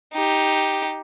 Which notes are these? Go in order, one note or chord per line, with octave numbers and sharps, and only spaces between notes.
D#4 G4